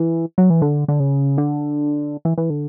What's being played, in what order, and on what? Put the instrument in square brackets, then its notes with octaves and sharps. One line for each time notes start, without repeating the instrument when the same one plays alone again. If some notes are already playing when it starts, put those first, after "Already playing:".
Already playing: [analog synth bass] E3
F#3
E3
D3
D3
C#3
D3
E3
E3
D3